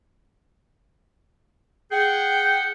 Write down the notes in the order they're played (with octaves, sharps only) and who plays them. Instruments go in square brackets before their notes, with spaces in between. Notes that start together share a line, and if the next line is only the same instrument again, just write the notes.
[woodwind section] G#4 F#5 G5